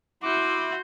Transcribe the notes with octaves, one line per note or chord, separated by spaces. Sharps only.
E4 F#4 C6 D6 G6